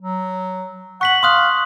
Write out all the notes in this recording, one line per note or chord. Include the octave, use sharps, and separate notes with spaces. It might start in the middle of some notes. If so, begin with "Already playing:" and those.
F#3
F#5 C#6 B6 F#7
F5 C6 D#6 F#6